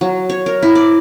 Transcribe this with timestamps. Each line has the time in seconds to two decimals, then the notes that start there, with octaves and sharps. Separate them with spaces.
0.01 F#3
0.30 C#5
0.46 A#4
0.63 E4
0.75 D5